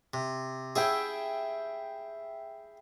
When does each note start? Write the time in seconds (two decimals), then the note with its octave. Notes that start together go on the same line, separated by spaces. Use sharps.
0.14 C3
0.76 E4 G#4 E5 G5